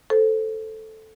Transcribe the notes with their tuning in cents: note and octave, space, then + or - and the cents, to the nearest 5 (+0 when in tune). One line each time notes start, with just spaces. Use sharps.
A4 +0 C5 +0